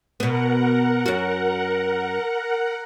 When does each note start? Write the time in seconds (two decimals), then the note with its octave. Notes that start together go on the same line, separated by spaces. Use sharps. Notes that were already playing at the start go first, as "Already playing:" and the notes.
0.20 B2 B3 A#4 F#5
1.06 F#2 F#4